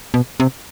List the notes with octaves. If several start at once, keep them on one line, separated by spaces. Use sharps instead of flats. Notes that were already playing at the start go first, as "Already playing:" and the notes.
B2
C3